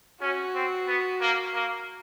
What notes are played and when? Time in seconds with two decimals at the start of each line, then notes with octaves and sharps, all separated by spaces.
0.20 C#4 F#4
0.55 C4
0.87 B3
1.21 A#3
1.54 A#3